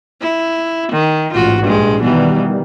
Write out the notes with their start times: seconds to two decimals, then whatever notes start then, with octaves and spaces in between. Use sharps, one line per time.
0.21 E4
0.92 D#3
1.33 A1 G#2 F4 F#4
1.63 A#1 G2 G#3
2.01 B2 D#3 E3 G3